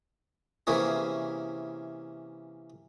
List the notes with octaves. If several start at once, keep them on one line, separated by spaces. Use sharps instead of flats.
C3 E3 A#3 C#4 E4 G#4